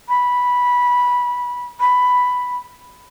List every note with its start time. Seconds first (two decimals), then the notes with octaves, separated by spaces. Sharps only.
0.09 B5
1.80 B5